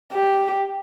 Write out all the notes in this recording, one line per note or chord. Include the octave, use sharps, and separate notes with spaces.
G4